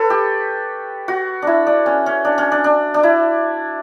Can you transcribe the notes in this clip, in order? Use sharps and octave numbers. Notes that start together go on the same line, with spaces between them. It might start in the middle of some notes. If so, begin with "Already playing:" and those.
Already playing: A4 B4 C#5
G4
F#4
D4 E4
D4
C#4
C#4
D4
C#4
D4
D4
D4
E4